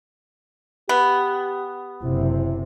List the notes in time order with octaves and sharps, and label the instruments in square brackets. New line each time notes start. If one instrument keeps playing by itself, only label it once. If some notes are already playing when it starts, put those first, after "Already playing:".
[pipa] B3 [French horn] G4
[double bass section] F#1 C3 [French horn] E4